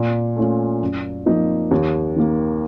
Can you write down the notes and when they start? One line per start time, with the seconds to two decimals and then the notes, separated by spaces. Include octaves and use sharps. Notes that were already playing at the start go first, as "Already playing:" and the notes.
Already playing: A#2
0.36 A3 C#4 F4
0.81 F#2
1.26 F3 A#3 D#4
1.71 D#2
2.16 D#3 A#3